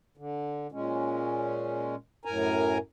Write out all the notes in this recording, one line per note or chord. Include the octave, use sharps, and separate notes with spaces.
D3
A#2 G#3 C#4
F#2 A2 A#4 G#5 A#5